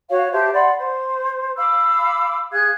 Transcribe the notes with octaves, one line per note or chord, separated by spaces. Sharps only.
F#4 C#5 F5
G4 C5 E5 A5
D5 F#5 B5 C6
C5
F5 B5 D6 E6
G#4 F5 F#6 G#6